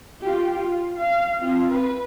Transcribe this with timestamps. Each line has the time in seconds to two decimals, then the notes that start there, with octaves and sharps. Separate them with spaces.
0.21 F4 G4
0.54 F4
0.97 F5
1.40 C4 F4
1.71 B4